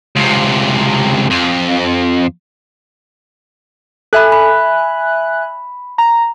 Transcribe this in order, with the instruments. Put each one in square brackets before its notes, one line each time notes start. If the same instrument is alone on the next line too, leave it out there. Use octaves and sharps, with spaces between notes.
[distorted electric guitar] C#2 C3
F2
[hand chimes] A4 B5 [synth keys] E5 G#5 F#6
[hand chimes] B5
[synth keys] A#5